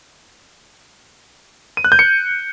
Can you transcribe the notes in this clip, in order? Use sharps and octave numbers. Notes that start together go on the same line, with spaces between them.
D#7
F#6
G6
C#7